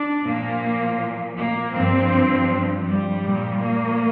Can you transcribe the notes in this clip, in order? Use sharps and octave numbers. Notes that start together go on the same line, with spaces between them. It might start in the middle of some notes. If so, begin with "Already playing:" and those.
Already playing: D4
A#2 F3 A#3
A#3
G2 F3 C4
G3
A#2 F3
A#3